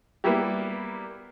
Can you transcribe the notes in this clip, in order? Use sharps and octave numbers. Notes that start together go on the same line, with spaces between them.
G3 A#3 B3 E4 G4